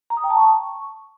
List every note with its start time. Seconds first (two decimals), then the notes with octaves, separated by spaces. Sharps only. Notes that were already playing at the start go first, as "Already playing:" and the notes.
0.10 A#5
0.17 D#6
0.24 G5
0.30 A5
0.37 C#6